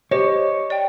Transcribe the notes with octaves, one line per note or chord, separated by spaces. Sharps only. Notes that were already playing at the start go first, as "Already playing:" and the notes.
G4 C5 C#5 D#5
D5 G5